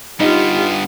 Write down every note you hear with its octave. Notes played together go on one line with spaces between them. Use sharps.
G2 B3 D#4 F4 G4